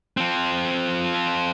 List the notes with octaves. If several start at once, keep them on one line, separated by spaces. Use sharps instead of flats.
F3 C4